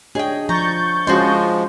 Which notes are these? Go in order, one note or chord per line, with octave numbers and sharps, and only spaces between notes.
D4 G#4 C#5 D#5 G5
F3 A#5 C#6 G6 A6
F3 G#3 C#4 F#4 C5 D#5 C6